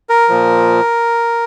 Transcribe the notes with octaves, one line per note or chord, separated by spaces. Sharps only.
A#4
A#2 F3